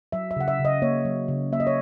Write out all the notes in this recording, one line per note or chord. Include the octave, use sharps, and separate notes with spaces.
F#3 E5
E5
C#3 F#5
E5
C#3
D#5
A#3 C#5
F#3
C#3
A#3 E5
D#5
C#5